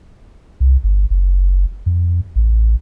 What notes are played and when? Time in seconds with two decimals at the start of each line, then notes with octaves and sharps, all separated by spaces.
0.60 C2
0.84 G1
1.10 F#1
1.86 F2
2.36 A1